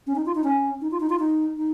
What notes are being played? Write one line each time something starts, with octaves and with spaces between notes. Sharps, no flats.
C#4
D#4
F4
D#4
C#4
D#4
F4
D#4
F4
D#4
D#4